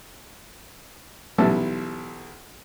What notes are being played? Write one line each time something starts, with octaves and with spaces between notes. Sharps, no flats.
B1 E3 G3 E4 A5